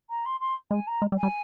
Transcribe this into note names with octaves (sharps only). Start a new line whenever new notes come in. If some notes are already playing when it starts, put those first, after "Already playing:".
A#5
C6
C6
G#3 G#5
A#5
G#3
G3
G#5
G3